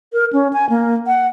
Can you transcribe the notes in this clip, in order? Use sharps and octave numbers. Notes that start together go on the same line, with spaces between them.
A#4
C#4
G#5
A#3
F#5